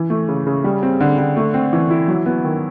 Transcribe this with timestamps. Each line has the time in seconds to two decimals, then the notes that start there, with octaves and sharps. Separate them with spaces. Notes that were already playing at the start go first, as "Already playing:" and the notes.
Already playing: E3
0.10 A3
0.29 C#3
0.47 C#3
0.64 G3
0.83 C4
1.01 D3
1.18 D3
1.37 A3
1.54 C4
1.73 E3
1.90 E4
2.08 F#3
2.26 B3
2.44 D#3